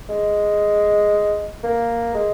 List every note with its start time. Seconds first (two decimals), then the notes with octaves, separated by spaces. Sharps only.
0.09 G#3
1.63 A#3
2.14 G#3